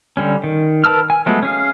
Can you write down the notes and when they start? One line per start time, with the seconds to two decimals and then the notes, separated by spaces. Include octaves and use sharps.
0.17 D3 G3 C#4
0.44 D#3
0.84 A#4 B4 A5 E6 F6
1.10 G#5
1.26 F3 F#3 G#3 A3 B3
1.43 C#4 G#4 F5